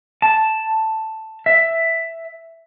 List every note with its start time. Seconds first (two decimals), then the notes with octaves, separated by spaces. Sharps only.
0.22 A5
1.46 E5